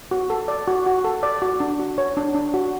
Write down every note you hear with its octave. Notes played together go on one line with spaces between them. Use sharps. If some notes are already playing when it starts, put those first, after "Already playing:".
F#4
A4
D5
F#4
F#4
A4
D5
F#4
D4
F#4
C#5
D4
D4
F#4